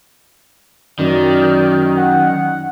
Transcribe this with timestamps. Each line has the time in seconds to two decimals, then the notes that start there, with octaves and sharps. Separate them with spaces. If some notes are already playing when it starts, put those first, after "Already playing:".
0.99 F#2 D#3 D5
1.97 F#5